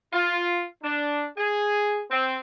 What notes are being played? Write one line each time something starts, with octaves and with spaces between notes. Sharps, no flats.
F4
D4
G#4
C4